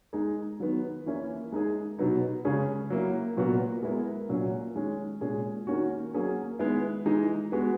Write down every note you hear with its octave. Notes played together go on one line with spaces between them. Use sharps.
G#3 D#4 G#4
D#3 F#3 B3
E3 A#3 C#4 E4
G#3 D#4 G#4
B2 F#3 B3 D#4
C#3 G#3 C#4 G#4
F#3 A#3 E4
A#2 F#3 B3 F#4 A#4
G#3 B3 E4 A#4
A#2 F#3 A#3 C#4
D#3 G#3 C#4
A#2 G#3 C#4 G#4
D#3 A#3 C#4 F#4
F#3 A#3 C#4 G#4
D#3 G#3 B3 E4
E3 G#3 D#4
G#3 B3 F#4